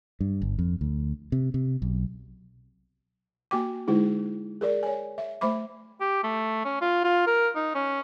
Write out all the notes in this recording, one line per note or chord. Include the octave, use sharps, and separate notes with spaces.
G2
G1
F2
D2
C3
C3
B1
A#3 F#4 G5 D6
D3 G#3 D#4 E4 G#4
G#4 A#4 D5
C#5 G#5
E5
A3 C5 E5 B5 D6
G4
A3
C#4
F4
F4
A#4
D#4
C#4